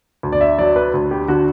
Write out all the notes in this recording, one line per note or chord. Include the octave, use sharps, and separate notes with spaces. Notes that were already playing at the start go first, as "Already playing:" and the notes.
D2
D5
E5
F#3 D5
B4
D2
G4
D3 F#4